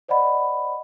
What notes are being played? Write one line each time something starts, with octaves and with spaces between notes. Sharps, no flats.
C5 D5 D#5 F#5 B5